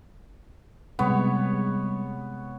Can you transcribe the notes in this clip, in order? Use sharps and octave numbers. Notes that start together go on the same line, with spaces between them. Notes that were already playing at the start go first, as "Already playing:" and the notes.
C3 G3 G#3 B3 C#5